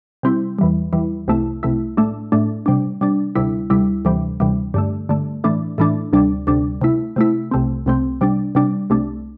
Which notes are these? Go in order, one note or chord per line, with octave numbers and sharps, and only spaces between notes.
C3 G3 C4 E4
E2 E3 G3
E2 E3 G3
C2 C3 A3 E4
C2 C3 A3 E4
A2 A3 D4
A2 A3 D4
C3 G3 D4
C3 G3 D4
D2 C3 G3 E4
D2 C3 G3 E4
D2 C3 E3 G3
D2 C3 E3 G3
G2 D3 A3
G2 D3 A3
A2 E3 A3 D4
A2 E3 A3 D4
D2 C3 G3 D4
D2 C3 G3 D4
C3 A3 E4
C3 A3 E4
C2 C3 A3 C4
C2 C3 A3 C4
C3 G3 D4
C3 G3 D4
C2 C3 A3 D4